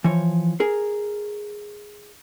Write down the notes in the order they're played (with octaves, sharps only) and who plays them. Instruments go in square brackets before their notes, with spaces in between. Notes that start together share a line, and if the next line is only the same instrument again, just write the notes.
[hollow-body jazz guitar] E3 F3 C#5
G#4 A#4